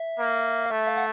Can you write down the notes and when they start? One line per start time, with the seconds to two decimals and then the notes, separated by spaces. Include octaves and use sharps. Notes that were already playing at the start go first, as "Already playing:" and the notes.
Already playing: E5
0.19 A#3
0.66 F5
0.70 A3 E5
0.87 F5
0.97 F#5